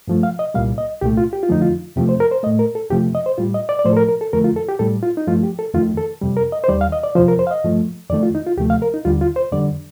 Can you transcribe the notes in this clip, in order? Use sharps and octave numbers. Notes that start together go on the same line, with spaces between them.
G2 F3 A3
F5
D#5
C2 A#2 G3 F5
D#5
C2 A#2 A3 G4
F4
G4
F4
F2 D3 F3 A3 D#4
F4
F2 C3 F3 A3 G4
C5
A#4
C5
A2 A3 D#5
A#4
A4
F2 C3 F3 A3 G4
D#5
C5
A2 G3 F4
D#5
D5
D5
A2 F3 A3 C5
A4
A#4
A#4
A4
F2 D3 F3 A3 A#4
F4
A4
G4
A2 G3 A4
F4
D#4
G2 F3 A3 F4
G4
A4
F2 D#3 A3 F4
A4
F2 C3 G3
A#4
D#5
C5
D#2 D#3 G3 D5
F5
D#5
D5
F2 C3 F3 C5
A#4
C5
F5
D#5
G2 F3 A3
F2 D#3 A3 D5
F4
D#4
F4
D2 C3 F3 A3 G4
F5
A#4
D#4
D#2 D3 G3 F4
F4
C5
F2 D3 G3 D5